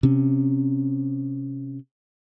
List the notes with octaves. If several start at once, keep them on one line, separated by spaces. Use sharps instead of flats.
C3 C#4